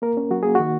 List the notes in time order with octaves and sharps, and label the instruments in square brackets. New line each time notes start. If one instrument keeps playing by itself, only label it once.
[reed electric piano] A#3 A#4
C#4
F#3 F#4
A#3 G#4
D#3 F#4